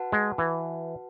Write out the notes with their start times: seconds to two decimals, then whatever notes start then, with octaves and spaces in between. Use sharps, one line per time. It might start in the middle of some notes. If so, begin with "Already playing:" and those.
Already playing: F#4 B4 F#5 A5
0.12 G#3
0.38 E3